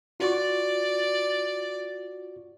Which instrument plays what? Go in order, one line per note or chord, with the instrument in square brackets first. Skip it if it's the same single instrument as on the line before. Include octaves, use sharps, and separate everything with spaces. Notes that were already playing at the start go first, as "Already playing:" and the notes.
[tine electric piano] F4 F#4 C#6 [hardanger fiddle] D5